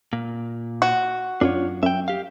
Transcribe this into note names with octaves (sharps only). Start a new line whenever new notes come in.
A#2
F#4
F#2 D4 F4 C#5
F#2 E5 G5
G4 F5